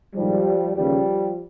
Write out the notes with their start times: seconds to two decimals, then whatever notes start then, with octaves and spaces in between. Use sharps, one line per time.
0.15 A#1 G#2 D#3 F3 G3
0.75 D#2 C#3 E3 F3 G3